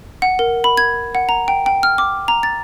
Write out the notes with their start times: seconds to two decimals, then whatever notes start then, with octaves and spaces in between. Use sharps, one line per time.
0.22 F#5
0.39 A#4
0.64 B5
0.77 G#6
1.15 F#5
1.29 A#5
1.48 G5
1.66 G5
1.83 F6
1.98 D6
2.28 A#5
2.43 A6